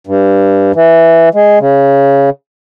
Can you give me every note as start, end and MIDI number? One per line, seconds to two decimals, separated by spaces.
0.07 0.72 43
0.75 1.29 52
1.35 1.59 56
1.60 2.30 49